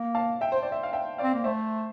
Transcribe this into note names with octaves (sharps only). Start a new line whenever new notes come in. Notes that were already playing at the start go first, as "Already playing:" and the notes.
Already playing: A#3
F5 A5
E5 G5
C5
D5
E5
F5
E5 G5
D5 F5
C4
A#3
A3 C5 E5